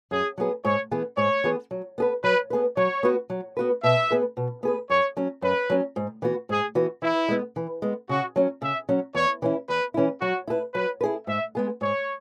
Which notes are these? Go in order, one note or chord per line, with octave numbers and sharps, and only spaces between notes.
F#2 G#4
F#3 B3 G#4
G#2 C#5
E3 B3 G#4
G#2 C#5
E3 B3 G#4
F#3
B3 G#4 B4
F#3 B4
B3 G#4 B4
F#3 C#5
B3 F#4 B4
F#3
B3 F#4 B4
B2 E5
B3 G#4 B4
B2
B3 G#4 B4
F#2 C#5
F#3 C#4
F#2 B4
F#3 C#4
G#2
E3 B3 F#4
G#2 G#4
E3 B3 F#4
E3 E4
G#3 B3
E3
G#3 B3
C#3 F#4
F#3 C#4
C#3 E5
F#3 C#4
E2 C#5
E3 C#4 E4
E2 B4
E3 C#4 E4
F#3 F#4
E4 G#4 B4
F#3 B4
B4
E4 G#4
G#2 E5
G#3 B3 G#4
G#2 C#5